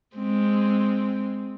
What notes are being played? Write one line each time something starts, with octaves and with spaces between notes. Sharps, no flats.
G#3 C4